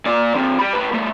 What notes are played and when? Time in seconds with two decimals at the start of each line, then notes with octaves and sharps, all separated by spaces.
0.06 A#2 D5
0.35 E3 C4
0.59 G4 B5
0.73 A2 B4
0.93 G3 A3